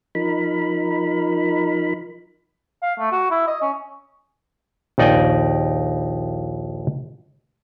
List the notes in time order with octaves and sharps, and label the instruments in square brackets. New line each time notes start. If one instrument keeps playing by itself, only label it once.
[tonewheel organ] F3 D#4 A#4 B5
[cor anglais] F5
A3
F#4
E4
D#5
C#4
[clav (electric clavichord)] A#1 D#2 D#4 D5 G5 G#5